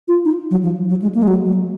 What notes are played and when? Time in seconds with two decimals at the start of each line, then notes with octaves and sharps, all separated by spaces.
0.08 F4
0.25 D#4
0.51 F#3
0.63 F3
0.89 F#3
1.02 G#3
1.15 A#3
1.23 G#3
1.28 F#3
1.45 F#3